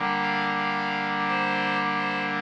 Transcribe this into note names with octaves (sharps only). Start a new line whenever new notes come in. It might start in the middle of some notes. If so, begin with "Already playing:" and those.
Already playing: D3 G3 A#3
F5
F5
C5
C5